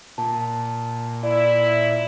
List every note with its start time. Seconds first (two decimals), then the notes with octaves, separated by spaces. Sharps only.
0.18 A#2 A5
1.23 E4 D5